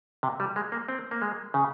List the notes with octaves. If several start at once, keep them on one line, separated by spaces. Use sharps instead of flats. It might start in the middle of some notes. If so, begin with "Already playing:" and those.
C3
G3
G#3
A#3
C4
A#3
G#3
C#3